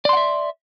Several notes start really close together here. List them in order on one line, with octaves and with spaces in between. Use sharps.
D5 C6 F#5 E5